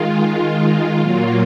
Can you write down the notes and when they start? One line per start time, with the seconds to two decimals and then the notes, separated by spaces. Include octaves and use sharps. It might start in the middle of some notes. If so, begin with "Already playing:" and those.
Already playing: D#3 G#3 F4
0.99 A#2 F#3 A#3 F4